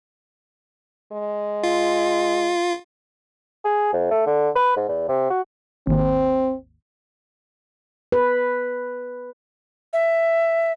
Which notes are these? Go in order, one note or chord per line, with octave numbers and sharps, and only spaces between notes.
G#3
F4
G#4
F2
A3
D3
B4
G#2
E2
C3
F#4
G#1 D#2 C4
B4
E5